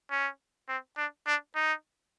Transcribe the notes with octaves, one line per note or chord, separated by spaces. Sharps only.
C#4
C4
D4
D4
D#4